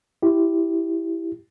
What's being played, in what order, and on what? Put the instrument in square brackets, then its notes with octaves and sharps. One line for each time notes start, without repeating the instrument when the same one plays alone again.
[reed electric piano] E4 G4